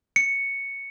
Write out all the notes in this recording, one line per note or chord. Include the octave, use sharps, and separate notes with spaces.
C#7